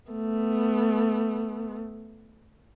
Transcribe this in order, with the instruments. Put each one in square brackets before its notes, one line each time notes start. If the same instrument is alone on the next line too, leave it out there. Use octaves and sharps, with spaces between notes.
[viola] A3 B3